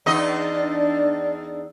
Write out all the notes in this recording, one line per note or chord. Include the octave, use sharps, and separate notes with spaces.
E2 D4 D#4 D5 D#5